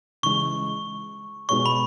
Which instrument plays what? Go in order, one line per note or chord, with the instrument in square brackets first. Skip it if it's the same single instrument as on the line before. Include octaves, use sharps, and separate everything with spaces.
[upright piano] C#3 E3 G#3 [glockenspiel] C#6
[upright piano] B2 G#3 B3 G#4 C#5 [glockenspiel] C#6
[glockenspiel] B5